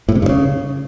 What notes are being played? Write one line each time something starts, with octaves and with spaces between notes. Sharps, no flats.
A2
C3
G2
C#3